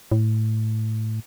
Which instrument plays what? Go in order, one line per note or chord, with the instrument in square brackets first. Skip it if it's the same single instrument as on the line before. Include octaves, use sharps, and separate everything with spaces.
[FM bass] A2